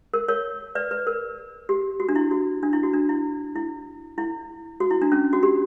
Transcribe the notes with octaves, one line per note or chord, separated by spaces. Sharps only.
A#4
A#4 C#5
B4 D5
B4
A#4
G4
F#4
D4
E4
F#4
D4
E4
F#4
D4
E4
E4
E4
F#4
E4
D4
C#4
F#4
G4